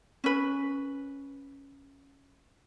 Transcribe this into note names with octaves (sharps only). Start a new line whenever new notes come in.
C#4 B4